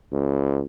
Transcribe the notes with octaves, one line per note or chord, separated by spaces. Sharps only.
C#2